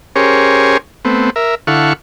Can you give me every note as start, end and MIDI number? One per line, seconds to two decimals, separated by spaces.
0.16 0.77 61
0.16 0.77 67
0.16 0.77 68
0.16 0.77 70
0.16 0.77 72
0.16 0.77 73
1.05 1.30 57
1.05 1.30 59
1.05 1.30 60
1.36 1.55 70
1.36 1.55 76
1.67 1.93 50
1.67 1.93 64
1.67 1.93 69
1.67 1.93 77
1.67 1.93 78
1.67 1.93 85